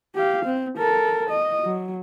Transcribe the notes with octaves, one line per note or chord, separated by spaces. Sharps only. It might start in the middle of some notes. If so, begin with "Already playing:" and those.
G4 F5
C4
A4 A#4
D#5
F#3